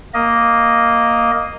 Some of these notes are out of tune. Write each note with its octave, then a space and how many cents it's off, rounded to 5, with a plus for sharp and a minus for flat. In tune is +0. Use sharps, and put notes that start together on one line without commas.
A#3 +0 D#5 +0